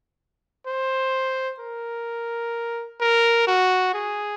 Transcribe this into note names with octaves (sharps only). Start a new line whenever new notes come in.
C5
A#4
A#4
F#4
G#4